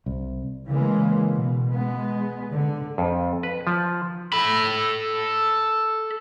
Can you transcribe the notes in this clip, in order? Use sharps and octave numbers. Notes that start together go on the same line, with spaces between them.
C2
C#3 E3 G#3 A#3
B2
G#3 B3
D3
F2
B4
F3
A4 B5